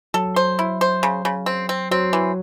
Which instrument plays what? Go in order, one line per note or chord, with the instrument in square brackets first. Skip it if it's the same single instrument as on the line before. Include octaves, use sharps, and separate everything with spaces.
[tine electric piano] F#3 [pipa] A4
[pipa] C5
E4
C5
C#3
C#3
C4
C4
[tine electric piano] F#3 [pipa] C4
[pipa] E3